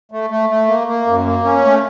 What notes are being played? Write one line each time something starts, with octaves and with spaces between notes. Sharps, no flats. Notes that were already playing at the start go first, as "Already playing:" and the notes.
A3
A3
A3
A#3
A#3
F#2
A#3
C#4
A3